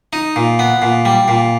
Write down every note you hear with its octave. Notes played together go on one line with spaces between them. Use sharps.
D#4
A#2
B3
A#2
G3
A#2